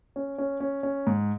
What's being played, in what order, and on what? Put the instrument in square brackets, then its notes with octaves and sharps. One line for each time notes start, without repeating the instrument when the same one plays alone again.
[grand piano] C#4
C#4
C#4
C#4
G#2